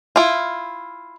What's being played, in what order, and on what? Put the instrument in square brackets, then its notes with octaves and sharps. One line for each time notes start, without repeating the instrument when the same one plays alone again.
[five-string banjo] E4 F4